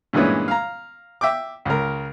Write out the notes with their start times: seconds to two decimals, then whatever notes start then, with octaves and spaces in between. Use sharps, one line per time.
0.13 G2 A#2 E3 G#3 B3 C#4
0.48 F5 A#5
1.21 E5 G5 D6
1.65 C#2 A#4